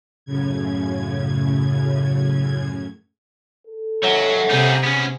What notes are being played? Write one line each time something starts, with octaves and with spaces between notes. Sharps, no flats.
F#2 A2 C#3 G#6
A4
F#3 C#5 E5 F#5
C3 G3 D#4 G#4
B3 C#4